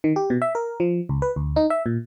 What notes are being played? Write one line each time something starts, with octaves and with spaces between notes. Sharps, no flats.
D#3
G4
B2
E5
A#4
F3
C#2
B4
D2
D#4
E5
A#2